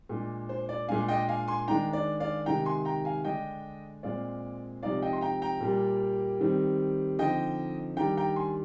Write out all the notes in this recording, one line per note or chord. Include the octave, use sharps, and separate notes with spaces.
A#2 G#3 D4
C5
D5
A#2 G#3 D4 F5 G#5
D#5 G5
F5 G#5
G#5 C6
D#3 G#3 D4 G5 A#5
D5
D5 F5
C3 D#3 G#3 D#4 G5 A#5
G#5 C6
G5 A#5
F5 G#5
D3 G#3 D4 D#5 G5
A#2 G#3 C4 D5 F5
C3 F3 G#3 C4 D#4 D5 F5
D#5 G5
C6
G5 A#5
G5 A#5
A#2 G3 A#3
D#3 G3 C4
D3 F3 C4 D#4 D#5 G5
D#3 G3 D4 G5 A#5
G5 A#5
G#5 C6